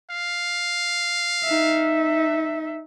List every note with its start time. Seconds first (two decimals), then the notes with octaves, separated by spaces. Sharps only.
0.11 F5
1.44 D#4 E5